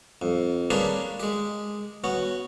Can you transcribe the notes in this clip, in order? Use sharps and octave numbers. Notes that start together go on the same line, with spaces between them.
F2
A#3 C#4 D4 G4 G#4 B4
G#3 G4
B3 C#4 F#4